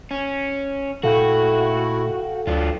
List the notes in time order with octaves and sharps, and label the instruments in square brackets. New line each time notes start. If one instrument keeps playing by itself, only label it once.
[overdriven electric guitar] C#4
[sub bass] A#2 [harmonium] A3 E4 [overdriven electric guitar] F#4 [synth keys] A4 F5 G5
[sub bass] D2 [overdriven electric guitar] F#3 F4 [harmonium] D4 D5